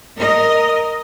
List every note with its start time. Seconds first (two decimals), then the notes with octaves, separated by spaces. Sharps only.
0.16 A#4 D#5